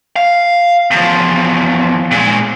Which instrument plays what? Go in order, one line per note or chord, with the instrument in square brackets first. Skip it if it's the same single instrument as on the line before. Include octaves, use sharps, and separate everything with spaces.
[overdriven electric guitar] F5
E2 F3
A#2 G#3